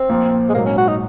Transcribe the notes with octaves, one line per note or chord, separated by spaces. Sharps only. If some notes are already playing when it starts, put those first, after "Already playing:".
Already playing: C4
A#1 A#2 F3 A#3
G#3
A#1 G#2 F#3 A#3
C#4
F#4
D#4